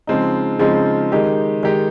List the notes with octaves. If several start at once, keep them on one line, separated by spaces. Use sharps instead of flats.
C#3 F3 G#3 C4 D#4
C#3 F3 G#3 C4 D#4
D#3 G#3 D#4 G4
D#3 G#3 D#4 G4